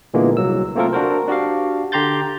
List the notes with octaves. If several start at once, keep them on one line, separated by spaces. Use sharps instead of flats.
A#2 D3 E3 G#3 A#3 B3
C2 F#3 E6
A3 A#3 C4 F4 A4 A#4
D4 F#4 A#4 C5
D4 F#4 G4 F5
D3 G4 A#5 C6 G6 A6